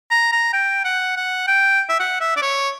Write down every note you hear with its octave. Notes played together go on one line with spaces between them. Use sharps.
A#5
A#5
G5
F#5
F#5
G5
E5
F#5
E5
D5
C#5